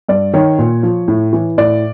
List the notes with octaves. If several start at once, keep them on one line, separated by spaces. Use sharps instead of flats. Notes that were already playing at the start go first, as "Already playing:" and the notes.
G2 D5
D#3 C#5
A#2
F3
A2
E3
A2 D5